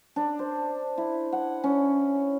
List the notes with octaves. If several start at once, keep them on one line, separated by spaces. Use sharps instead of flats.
D4
C5
E4
F#5
C#4